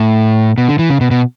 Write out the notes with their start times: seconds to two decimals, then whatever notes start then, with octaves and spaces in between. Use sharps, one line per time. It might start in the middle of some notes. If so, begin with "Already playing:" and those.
Already playing: A2
0.58 B2
0.69 D3
0.79 E3
0.90 C#3
1.01 B2
1.11 B2